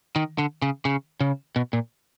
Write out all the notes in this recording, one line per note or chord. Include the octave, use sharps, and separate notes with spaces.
D#3
D3
C#3
C#3
C#3
B2
A#2